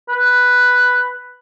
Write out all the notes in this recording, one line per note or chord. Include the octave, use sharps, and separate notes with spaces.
B4